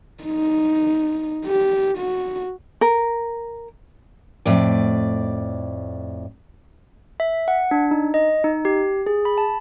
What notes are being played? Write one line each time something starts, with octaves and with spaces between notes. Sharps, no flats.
D#4
G4
F#4
A#4
F2 A2 D5
E5
F#5
D4
D#4
D#5
D#4
G4
G#4
B5
A5